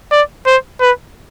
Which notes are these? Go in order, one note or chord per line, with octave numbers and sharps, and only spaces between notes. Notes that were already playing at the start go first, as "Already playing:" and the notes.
D5
C5
B4